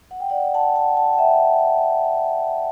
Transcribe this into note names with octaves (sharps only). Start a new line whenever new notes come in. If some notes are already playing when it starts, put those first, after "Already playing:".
F#5
G5
D5 F#5
F#5 A5
F#5 A5
F#5 A5
F#5
E5 G5